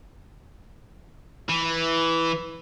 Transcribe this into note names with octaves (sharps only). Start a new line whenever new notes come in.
E3